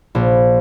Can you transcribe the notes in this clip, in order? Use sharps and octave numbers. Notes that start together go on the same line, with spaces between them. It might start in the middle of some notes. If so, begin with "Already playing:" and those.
A#1